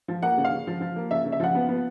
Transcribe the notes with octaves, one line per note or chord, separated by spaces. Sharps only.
F3
A#3 F#5
C#3
F5
C#3
F3
F3
A#3
C#3 E5
C#3
E5
F3 F#5
B3
B3